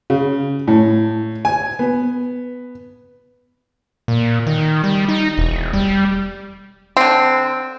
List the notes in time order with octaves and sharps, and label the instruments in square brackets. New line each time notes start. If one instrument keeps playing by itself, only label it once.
[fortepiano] C#3
A2
G#5
B3
[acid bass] A#2
D#3
G3
D#4
E1
G3
[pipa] D3 C4